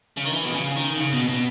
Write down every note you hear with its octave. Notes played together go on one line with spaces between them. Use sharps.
C#3
D#3
E3
B2
C#3
D#3
C#3
B2
B2